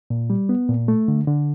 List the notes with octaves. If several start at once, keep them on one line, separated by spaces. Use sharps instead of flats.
A#2
G3
B3
A#2
A3
D3
D3